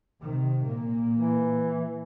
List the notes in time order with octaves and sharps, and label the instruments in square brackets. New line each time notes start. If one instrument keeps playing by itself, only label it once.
[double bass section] C3 D#3
A#2 A#3
[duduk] E3